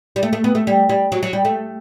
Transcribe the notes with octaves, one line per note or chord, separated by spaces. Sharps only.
G3
A3
A3
B3
A3
G3
G3
F#3
F#3
G3
A3